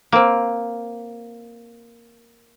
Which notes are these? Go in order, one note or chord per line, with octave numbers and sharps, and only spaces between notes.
A#3 C4